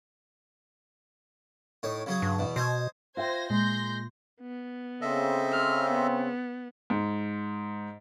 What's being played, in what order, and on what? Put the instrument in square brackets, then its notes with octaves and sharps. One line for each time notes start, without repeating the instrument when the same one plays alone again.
[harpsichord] A2 D#4 C#5
C#3 F#3 G#4
[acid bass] G2
[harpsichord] E2 B2
[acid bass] B2 [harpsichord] C5 D#5 G#5
[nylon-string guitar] F4 E5 G5 [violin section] C5 G#6 A#6
[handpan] A#2 [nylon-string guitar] G#3 [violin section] C6 G6 A#6
[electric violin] B3
[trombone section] C#3 C4 [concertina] A4 D#5 E5
[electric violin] F6
B3
[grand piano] G#2